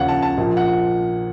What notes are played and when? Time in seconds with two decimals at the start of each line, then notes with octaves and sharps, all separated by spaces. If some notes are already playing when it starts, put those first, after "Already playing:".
Already playing: D#2 C#3 F3 C#5 F5 F#5
0.09 A5
0.22 A5
0.37 A#1 A#2 F3
0.57 F#5